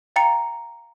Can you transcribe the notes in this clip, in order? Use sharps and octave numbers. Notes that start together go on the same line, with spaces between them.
F5 G5 A#5 A6 C#7